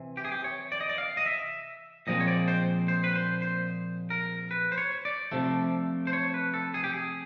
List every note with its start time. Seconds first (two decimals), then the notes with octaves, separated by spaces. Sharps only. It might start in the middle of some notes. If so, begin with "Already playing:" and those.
Already playing: C3 E3
0.17 G4
0.25 G#4
0.32 G4
0.44 C#5
0.72 D5
0.81 D#5
0.89 D5
0.98 F5
1.17 D#5
1.26 E5
2.07 A#2 F3 G#3 C4 D#5
2.20 C#5
2.28 D5
2.48 C5
2.88 C5
3.04 B4
3.15 C5
3.42 C5
4.10 A#4
4.51 B4
4.72 C5
4.78 C#5
5.05 D5
5.32 C3 F3 A3
6.07 C5
6.13 C#5
6.34 B4
6.54 A4
6.74 G#4
6.84 G4
6.93 G#4